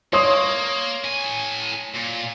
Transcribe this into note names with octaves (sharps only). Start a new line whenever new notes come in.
A#3 C#5 C6 D#6
A2 G#5
A#2